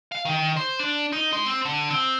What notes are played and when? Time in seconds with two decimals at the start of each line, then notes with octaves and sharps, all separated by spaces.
0.12 F5
0.25 D#3
0.57 C5
0.79 D4
1.13 D#4
1.33 G#3
1.46 C4
1.65 D3
1.91 C4